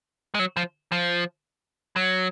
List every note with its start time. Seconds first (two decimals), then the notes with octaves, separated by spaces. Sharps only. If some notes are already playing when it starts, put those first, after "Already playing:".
0.34 G#3
0.39 F#3
0.57 F3
0.92 F3
1.96 F#3